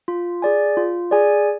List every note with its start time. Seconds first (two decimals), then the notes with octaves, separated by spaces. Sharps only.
0.08 F4
0.42 G#4 D5 G#5
0.77 F4
1.11 G#4 D5 G#5